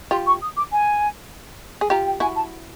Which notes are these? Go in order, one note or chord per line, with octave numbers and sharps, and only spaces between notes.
F4 G4 C6
C#6
D#6
D6
G#5
G#4
F4 G4 A#5
G5
E4 F#4 G#5
A5